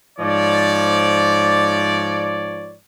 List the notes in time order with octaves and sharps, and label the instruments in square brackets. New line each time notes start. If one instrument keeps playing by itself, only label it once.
[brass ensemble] G#2 F3 C#5 D5